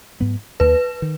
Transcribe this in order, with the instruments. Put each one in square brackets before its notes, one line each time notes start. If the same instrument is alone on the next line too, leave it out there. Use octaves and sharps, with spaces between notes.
[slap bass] G#2 F#3 B3
[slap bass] D#2 D#3 A#3 [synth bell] B4
[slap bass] D#3